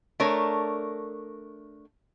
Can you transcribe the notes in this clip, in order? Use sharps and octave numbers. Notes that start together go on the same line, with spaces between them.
A3 D4 A#4 C#5